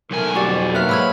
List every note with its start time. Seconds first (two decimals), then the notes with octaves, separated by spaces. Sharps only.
0.11 B1 A3 A#4 G#5
0.35 F2 G3 F#4 G4 D5
0.75 F#3 A#3 B4 C#5 E5 F6
0.89 G#2 B5 E6 G#6